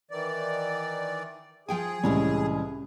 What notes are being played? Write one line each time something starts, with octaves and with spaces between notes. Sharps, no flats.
D#3 E3 D5
F3 G#4 G5 G#5
C2 A2 E3 G#3 C#4